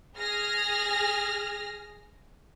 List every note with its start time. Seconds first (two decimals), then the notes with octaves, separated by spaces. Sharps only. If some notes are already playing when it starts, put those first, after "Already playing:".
0.19 G#4 F6 A#6